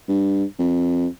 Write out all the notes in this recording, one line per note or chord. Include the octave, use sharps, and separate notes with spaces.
G2
F2